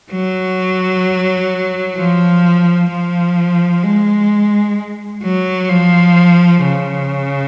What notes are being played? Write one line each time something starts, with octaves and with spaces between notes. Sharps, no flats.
F#3
F3
F3
G#3
F#3
F3
C#3